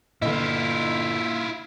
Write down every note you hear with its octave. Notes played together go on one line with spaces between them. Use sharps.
G1 A#2 E4 F4 D#5